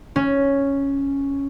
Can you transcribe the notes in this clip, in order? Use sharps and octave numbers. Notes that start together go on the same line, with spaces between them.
C#4